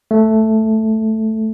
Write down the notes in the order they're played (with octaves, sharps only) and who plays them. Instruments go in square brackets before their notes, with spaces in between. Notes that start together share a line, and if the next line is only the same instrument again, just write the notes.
[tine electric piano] A3